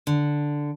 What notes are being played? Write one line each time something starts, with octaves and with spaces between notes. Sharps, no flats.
D3